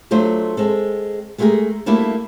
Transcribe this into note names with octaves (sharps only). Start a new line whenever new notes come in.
F#3 A3 D4 F4 C5
G#3 C4 A4
G#3 A3 B3 G4 G#4 A#4
G3 A3 A#3 D4 E4 F#4